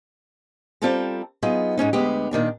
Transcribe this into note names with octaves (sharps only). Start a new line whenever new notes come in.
G3 C4 F4 A4 A5 A#5
F#3 B3 D#4 F4 G#4
G#2 G#3 C#4 D#4
D2 G#3 B3 G4
A#2 D#3 D4 A#5